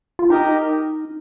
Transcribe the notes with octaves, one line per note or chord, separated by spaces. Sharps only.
F4
D#4 G4 A#4 D#5